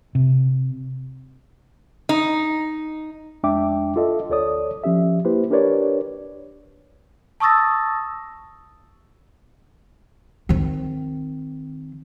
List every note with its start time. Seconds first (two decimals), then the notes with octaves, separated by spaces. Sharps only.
0.15 C3
2.09 D#4
3.43 F2 G#3 D4 E5 G5 D6
3.96 F4 A4 D#5 E5
4.30 D2 A4 C#5 D5 D#6
4.84 F3 C#4 G4 E5
5.25 A#3 E4 G4 B4 C5
5.50 D4 G4 A#4 B4 C#5 D5
7.40 A5 C#6 D#6 E6 A6 A#6
10.49 D#3 C4